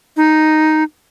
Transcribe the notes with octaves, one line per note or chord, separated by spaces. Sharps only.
D#4